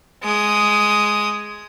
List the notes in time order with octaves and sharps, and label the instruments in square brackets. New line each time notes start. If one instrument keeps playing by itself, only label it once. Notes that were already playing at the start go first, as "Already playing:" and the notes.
[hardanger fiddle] G#3 D#6